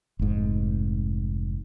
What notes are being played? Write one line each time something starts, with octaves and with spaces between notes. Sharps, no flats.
F1 G#2